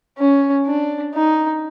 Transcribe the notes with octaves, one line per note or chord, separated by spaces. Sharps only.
C#4
D4
D#4